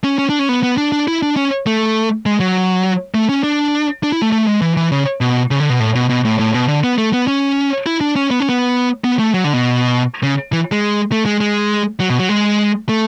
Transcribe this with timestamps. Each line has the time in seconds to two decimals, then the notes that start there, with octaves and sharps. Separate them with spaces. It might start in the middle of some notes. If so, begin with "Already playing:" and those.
0.04 C#4
0.18 C#4
0.29 D4
0.39 C#4
0.49 B3
0.63 B3
0.78 D4
0.92 D4
1.08 E4
1.22 D4
1.37 C#4
1.66 A3
2.26 G#3
2.40 F#3
3.14 A3
3.29 C#4
3.44 D4
4.03 D4
4.12 E4
4.22 A3
4.32 A3
4.47 G#3
4.62 E3
4.77 E3
4.92 C#3
5.21 B2
5.51 C#3
5.60 D3
5.70 B2
5.80 A2
5.95 B2
6.10 B2
6.25 A2
6.40 A2
6.54 B2
6.68 D3
6.84 B3
6.98 A3
7.13 B3
7.27 C#4
7.86 E4
8.01 D4
8.16 C#4
8.31 B3
8.40 C#4
8.49 B3
9.04 B3
9.19 A3
9.34 F#3
9.44 D3
9.53 B2
10.23 C#3
10.53 E3
10.72 G#3
11.12 A3
11.26 G#3
11.41 G#3
12.00 F#3
12.10 B2
12.19 F#3
12.29 G#3
12.89 A3